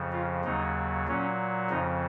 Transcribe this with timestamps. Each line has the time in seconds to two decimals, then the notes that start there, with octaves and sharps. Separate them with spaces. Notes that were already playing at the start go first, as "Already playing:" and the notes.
Already playing: F2 C#3 F3
0.12 F4
0.44 D#2 C#3 F#3 D#4
1.08 A#2 F#3 C#4
1.70 F2 C#3 F3 D#4